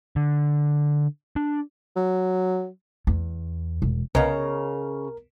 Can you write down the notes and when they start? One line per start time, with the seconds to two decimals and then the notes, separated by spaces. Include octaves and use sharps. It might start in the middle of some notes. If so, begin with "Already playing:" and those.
0.16 D3
1.36 D4
1.96 F#3
3.07 E2
3.82 E1
4.15 C2 C#3 B3 A#4 C#5 D#5 A#5